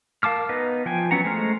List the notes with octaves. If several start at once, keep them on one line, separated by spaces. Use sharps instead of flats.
A#4 F5 A5 D6 F6
B3 D#4 B4 D#5
F3 G5 G#5
F#3 B3 C#4 F#5 A#5
G#3 A3 C5 A#5 F6